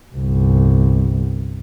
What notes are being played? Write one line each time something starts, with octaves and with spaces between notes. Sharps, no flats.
G1 C2